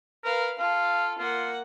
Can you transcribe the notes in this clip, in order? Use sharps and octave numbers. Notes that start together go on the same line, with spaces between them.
A#4 B4 F5
F4 A4 F5
A#3 F4 F#5